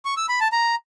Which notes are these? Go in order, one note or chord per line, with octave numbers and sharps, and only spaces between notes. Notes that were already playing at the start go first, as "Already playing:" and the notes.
C#6
E6
B5
A5
A#5